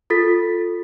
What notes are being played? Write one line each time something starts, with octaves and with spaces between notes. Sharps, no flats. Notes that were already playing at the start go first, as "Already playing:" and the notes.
F4 A4 A6 B6